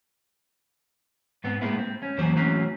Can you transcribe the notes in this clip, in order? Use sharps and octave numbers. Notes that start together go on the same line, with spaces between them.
G#2 B3 C4
A2 G#3 A#3 B3 E4
C4
C#4
F2 E3 F#3 A#3 C5
E3 F#3 A3 C4 C#4 F#4